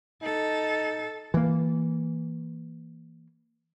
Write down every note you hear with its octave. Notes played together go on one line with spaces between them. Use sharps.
D#4 A4
E3 A#3